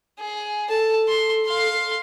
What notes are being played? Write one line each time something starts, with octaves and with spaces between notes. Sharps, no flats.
G#4
A4 A5
C6
F5 C6